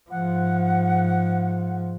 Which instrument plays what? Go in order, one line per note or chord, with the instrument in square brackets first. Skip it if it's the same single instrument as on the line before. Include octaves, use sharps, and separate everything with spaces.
[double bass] G#2 F3 [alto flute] F#5